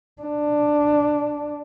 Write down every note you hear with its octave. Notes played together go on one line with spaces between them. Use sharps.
D4